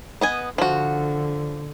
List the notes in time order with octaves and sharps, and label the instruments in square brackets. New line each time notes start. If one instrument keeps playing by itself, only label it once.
[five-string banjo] B3 D#5 G#5
[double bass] D3 [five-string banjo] F3 F#4